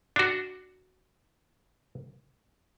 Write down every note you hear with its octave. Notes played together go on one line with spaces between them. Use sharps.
D4 F#4